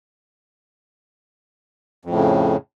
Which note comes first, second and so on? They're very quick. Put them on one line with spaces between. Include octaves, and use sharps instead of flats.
F2 A2 C#3